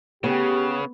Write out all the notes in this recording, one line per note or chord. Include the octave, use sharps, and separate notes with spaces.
C#3 B3 G4